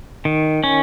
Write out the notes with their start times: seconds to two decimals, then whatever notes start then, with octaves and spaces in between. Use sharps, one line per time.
0.25 D#3
0.64 C#4